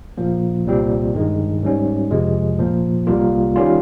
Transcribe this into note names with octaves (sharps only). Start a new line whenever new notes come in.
A#2 F3 A#3
C2 A#2 G3 C4
G2 D#3 G#3
G#2 G3 C#4
F2 C3 F3 G#3
A#2 F3 A#3
C2 C3 G3 A#3 F4
D#3 G3 C#4 F4